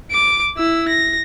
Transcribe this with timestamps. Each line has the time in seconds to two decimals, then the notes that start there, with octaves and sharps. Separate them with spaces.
0.11 D6 D7
0.57 E4 E6
0.89 A#6